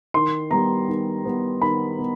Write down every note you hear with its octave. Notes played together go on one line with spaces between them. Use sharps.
D#3 C6
G3 B3 A#5
D#3
G3 B3
D#3 B5
B3